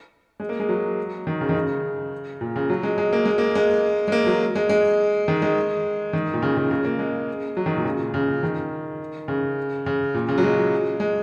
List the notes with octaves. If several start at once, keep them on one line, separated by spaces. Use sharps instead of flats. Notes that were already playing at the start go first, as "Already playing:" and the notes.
G#3
A#3
G#3
F#3
D#3
C#3
D#3
C#3
A#2
C#3
F#3
G#3
G#3
A#3
G#3
A#3
G#3
G#3
A#3
F#3
G#3
G#3
D#3
G#3
D#3
A#2
C#3
C#3
C#3
A#3
G#3
F#3
D#3
A#2
C#3
A#2
C#3
D#3
C#3
C#3
A#2
C#3
F#3
G#3
G#3